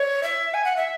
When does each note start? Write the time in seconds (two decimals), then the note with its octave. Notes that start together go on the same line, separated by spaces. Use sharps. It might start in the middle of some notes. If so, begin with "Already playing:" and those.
Already playing: C#5
0.23 E5
0.54 G#5
0.65 F#5
0.77 E5